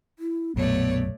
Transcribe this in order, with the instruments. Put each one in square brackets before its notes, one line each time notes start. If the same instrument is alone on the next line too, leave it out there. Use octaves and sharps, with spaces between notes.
[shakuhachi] E4
[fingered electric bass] B1 F#2 A#2 [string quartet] A3 C#5 D5 [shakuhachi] B3